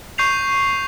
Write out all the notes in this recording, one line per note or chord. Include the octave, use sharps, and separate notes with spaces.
C#6 G6 C7 F7